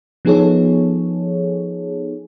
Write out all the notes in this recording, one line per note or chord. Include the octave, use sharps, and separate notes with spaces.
F3 B3 D#4 G#4 A4 C#5